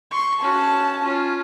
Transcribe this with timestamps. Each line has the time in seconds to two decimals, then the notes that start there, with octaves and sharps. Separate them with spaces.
0.11 C6 C#6
0.42 C#4 F#4 A5
1.02 C#4 F4